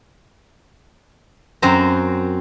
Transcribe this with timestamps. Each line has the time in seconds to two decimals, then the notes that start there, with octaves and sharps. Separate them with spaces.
1.62 F#2 C4 C5 A#5